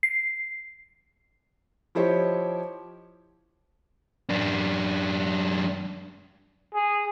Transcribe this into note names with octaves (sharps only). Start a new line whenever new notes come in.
C7
F3 E4 G4 C5 C#5 D#5
F#2 D4
G#4